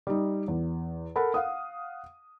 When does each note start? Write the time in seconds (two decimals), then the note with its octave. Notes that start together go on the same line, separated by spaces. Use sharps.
0.07 G3 D#4
0.48 E2
1.16 A4 A#4 F#5 B5
1.34 F5 F#5 D#6